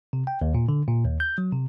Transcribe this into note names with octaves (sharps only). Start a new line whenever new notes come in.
C3
G5
D#2
A#2
D3
A#2
D#2
G6
F#3
C3